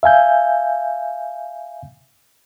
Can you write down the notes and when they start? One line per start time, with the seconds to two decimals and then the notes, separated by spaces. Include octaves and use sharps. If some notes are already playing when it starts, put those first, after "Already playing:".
0.03 E5 F5 G#5 G6